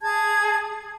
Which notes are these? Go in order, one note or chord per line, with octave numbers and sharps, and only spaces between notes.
G#4 A5 G#6